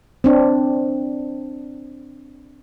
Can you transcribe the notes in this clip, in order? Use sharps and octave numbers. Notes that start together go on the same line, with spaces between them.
C4 D4